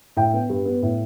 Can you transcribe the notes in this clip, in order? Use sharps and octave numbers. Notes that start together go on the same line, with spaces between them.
A2 G5
B3
G2
B3
A2